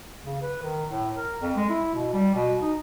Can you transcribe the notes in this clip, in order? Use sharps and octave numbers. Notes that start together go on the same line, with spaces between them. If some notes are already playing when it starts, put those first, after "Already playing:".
C#3
B4
D#3
A2
A#4
F2
G#3
E4
B2
G3
B2
D#4